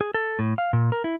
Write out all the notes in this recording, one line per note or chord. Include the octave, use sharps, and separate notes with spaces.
G#4
A4
A2
F5
A#2
A#4
E4